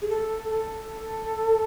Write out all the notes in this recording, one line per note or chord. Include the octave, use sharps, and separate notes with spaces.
G#4
A4
A4